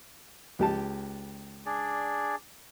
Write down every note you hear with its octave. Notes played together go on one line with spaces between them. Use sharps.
C#2 G4 A5
D4 G#4 D5